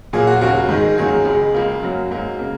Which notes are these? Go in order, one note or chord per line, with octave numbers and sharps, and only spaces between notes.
A#2 F#3 A#3 G#4
F#4
D#2 C#3 F#3 A#3 F#4
G#2 D#3 G#3
F#2 D#3 F#3 A#3 G#4
C#2 C#3 G#3
C#2 C#3 A#3
F#2 F#3 A#3
G#2 F#3 A#3
C#3 A#3